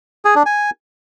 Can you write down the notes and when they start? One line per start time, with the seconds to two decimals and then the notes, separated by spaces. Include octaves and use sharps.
0.25 G#4
0.35 D4
0.46 G#5